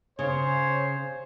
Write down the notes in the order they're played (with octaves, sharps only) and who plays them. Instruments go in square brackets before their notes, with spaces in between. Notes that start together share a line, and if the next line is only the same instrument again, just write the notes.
[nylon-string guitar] C#3 [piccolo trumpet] C5 [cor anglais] C#5